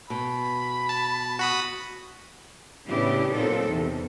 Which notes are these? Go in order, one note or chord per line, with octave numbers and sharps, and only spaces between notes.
B2 B5
A5
F#4 B5 D#6
A2 C#3 B3 D4 E4 G4
A#2 F#3 C4 D#4 A4
E2 C3 E3